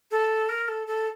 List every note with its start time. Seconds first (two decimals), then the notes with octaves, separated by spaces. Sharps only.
0.11 A4
0.49 A#4
0.68 A4
0.87 A4